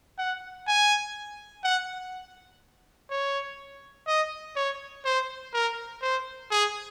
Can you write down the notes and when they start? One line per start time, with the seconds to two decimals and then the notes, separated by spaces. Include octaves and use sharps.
0.18 F#5
0.67 G#5
1.64 F#5
3.10 C#5
4.07 D#5
4.56 C#5
5.05 C5
5.54 A#4
6.02 C5
6.51 G#4